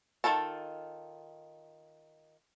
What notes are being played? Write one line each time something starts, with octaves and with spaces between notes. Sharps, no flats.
D#3 F4 A4 A5